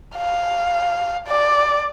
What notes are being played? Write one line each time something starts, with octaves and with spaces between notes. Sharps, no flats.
F5
D5